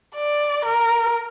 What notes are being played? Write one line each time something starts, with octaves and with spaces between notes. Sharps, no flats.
D5
A#4